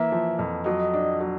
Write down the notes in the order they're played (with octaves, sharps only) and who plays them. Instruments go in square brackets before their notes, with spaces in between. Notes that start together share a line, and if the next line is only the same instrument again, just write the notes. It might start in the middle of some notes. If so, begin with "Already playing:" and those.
Already playing: [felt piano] E3 A#3 [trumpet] E5
[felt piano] F3
F2
[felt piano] F#3 [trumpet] D#5
[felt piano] D4
F#3